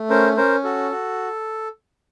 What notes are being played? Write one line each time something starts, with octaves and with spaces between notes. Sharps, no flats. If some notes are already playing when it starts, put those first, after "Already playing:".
Already playing: A3
C#4 A#4 C5
C#4 A#4 C5
F#4 A4
F#4